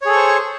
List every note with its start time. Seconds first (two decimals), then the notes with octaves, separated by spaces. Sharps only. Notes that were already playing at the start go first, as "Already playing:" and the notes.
0.02 C#5
0.06 G#4
0.09 A4
0.12 C#6
0.16 C5